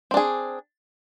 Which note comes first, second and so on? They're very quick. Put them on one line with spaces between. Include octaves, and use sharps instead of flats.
C4 D4 G#4